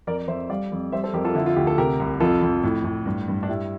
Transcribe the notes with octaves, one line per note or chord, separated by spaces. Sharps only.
F2 A#4 D5
F2 C5 E5
G3 D5 F5
F2
G3 C5 E5
A4 C5
F2 G4 A#4
F4 A4
D3 E4
F4
D2 G4
A4
C3 G4 A#4
C2
F2 F4 A4
F2
A2
A2
G2
G2
D4
G3 E4